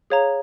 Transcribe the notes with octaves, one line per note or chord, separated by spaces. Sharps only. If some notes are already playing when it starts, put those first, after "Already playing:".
G#4 C#5 F5 A#5